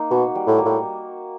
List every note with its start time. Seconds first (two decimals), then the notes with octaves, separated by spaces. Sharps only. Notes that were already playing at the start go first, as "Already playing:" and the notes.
Already playing: A#3 D#4
0.11 B2 F#4
0.35 G3
0.47 A2
0.59 A#3
0.65 A2